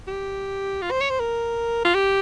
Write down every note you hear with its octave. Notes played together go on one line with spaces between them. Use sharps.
G4
F4
C5
C#5
C5
A#4
F4
G4